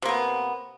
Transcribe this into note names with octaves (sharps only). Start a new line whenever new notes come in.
C3 A#3 B3